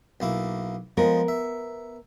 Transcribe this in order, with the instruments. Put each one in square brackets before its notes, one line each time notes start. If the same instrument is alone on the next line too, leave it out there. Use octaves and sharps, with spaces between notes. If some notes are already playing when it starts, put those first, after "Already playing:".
[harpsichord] B1 A#3 E4
[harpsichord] F3 G#3 [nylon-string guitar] B3 A#4
[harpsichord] E5